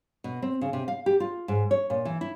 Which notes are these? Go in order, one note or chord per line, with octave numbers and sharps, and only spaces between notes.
B2
C4
C#3
C3
F5
G4
F4
G#2
C#5
A#2
E3
E4